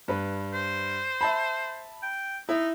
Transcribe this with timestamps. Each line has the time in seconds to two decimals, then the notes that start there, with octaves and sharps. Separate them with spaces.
0.08 G2 B4
0.53 C5
1.21 E5 A5 B5
2.03 G5
2.49 D#4 E4